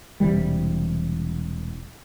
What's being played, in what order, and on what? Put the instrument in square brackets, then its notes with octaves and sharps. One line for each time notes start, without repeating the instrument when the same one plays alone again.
[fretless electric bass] E1 C3 E3 G3